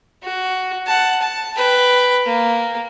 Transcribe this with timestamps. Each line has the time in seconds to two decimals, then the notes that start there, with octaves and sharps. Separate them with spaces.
0.23 F#4
0.86 F#5 A5
1.21 A5
1.57 B4 G5
2.26 A#3